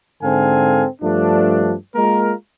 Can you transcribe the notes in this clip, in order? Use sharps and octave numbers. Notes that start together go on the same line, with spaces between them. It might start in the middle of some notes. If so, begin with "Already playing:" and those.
G#2 D3 C4 A4 F5 G#5
G2 F3 A3 D4
G#3 A#3 F4 A#4